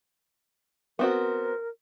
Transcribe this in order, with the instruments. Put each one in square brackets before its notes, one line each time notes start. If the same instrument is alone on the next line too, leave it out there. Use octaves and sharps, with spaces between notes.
[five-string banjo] B3 C4 F#4 [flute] A#4